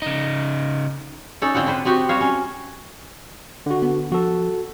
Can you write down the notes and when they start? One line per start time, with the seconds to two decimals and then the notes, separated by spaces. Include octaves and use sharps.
0.02 C#3 D#4
1.42 C#4 D#4 A4 D5
1.54 D3 C4 F4 F#5
1.66 D3 D4 B4 C5
1.85 B3 C4 F#4 G4
2.09 G3 F#4 C#5 F5
2.21 C#4
3.66 D3 F#4
3.82 B3
4.12 F3 F#4 A4